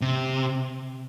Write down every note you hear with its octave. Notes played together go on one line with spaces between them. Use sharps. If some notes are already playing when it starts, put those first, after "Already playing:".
C3